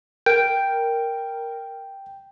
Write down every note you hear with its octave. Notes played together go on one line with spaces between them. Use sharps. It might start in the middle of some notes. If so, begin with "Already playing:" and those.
A#4 G5